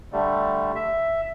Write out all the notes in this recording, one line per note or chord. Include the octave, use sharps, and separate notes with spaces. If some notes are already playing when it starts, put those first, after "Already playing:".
D3 G3 A3
E5